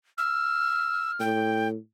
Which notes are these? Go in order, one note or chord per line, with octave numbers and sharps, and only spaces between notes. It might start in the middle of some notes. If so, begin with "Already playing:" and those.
E6 F6
A2 G5